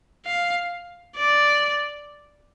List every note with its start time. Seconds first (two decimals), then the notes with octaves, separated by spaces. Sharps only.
0.25 F5
1.16 D5